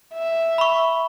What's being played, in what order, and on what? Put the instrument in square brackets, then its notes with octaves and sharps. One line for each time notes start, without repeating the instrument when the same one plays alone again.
[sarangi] E5
[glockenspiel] B5 C#6